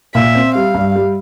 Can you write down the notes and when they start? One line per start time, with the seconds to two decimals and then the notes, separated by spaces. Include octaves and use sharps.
0.15 A#2 E5
0.35 C4
0.55 G3 F5
0.75 G2
0.96 G3